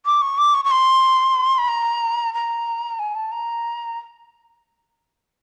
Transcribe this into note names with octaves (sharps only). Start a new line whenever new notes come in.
D6
C#6
D6
C#6
C#6
C6
B5
A#5
A#5
G#5
A5
A#5